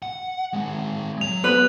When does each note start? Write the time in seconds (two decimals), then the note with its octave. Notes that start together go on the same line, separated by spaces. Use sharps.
0.03 F#5
0.53 G#3 C4
1.21 F#3 F7
1.44 B3 B4